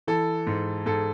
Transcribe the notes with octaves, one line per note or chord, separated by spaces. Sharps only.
E3 A4
G#2
G#2 A4